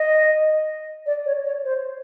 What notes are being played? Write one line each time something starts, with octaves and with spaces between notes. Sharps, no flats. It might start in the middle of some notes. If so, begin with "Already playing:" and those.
Already playing: D#5
D5
C#5
C#5
C5